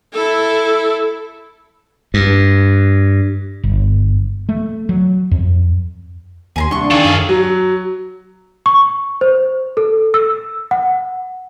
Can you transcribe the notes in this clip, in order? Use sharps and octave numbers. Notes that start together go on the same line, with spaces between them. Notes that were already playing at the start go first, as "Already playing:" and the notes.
E4 A4
G2
G1
A3
F#3
F2
D#2 G#5 A#5 C6
C2 D4 C6 C#6
D#3 G#4 A4 F5 G5 C#6
F#2 A#3 F5
F#3
C#6
C5
A4
E6
F#5